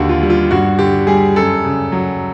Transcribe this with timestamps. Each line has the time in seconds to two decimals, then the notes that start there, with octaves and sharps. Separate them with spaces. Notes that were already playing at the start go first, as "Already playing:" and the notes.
Already playing: D#2 D3 F#4 G4
0.09 F4
0.23 G3
0.30 F4
0.51 G2 F#4
0.79 D3 G4
1.07 G3 G#4
1.36 F#2 A4
1.64 C#3
1.92 F#3